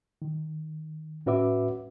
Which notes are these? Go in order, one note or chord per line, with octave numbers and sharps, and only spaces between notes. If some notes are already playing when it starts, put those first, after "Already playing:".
D#3
A2 C#4 F#4 B4 E5 D6